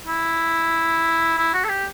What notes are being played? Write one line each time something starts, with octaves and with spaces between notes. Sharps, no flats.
E4
E4
F#4
A4
G4